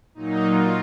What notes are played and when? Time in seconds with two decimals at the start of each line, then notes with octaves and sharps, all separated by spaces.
0.15 A#2 F#3 D#4
0.43 F4